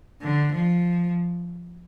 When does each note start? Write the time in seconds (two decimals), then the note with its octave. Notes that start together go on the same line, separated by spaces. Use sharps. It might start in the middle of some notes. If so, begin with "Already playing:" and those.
0.21 D3
0.52 F3